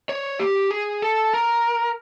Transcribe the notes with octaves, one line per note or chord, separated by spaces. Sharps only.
C#5
G4
G#4
A4
A#4